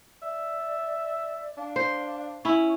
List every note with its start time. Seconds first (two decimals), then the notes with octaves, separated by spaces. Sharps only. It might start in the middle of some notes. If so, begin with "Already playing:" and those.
0.22 D5 E5
1.58 D4 F5
1.76 C5
2.45 C#4 E4 C#6